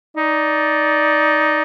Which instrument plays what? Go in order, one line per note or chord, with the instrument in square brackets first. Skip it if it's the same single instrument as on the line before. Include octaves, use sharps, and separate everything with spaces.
[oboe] D#4 [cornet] D5